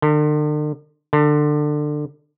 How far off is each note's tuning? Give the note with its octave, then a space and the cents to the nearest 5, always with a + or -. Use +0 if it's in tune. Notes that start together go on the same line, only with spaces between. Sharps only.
D3 +40
D3 +20